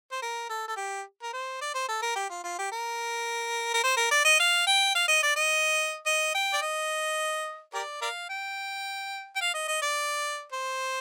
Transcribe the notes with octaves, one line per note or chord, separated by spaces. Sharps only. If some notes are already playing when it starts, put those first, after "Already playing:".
C5
A#4
A4
A4
G4
A#4
C5
D5
C5
A4
A#4
G4
F4
F4
G4
A#4
A#4
C5
A#4
D5
D#5
F5
G5
F5
D#5
D5
D#5
D#5
G5
D5
D#5
G4 A#4 D5
A#4 D5 F5
G5
G5
F5
D#5
D#5
D5
C5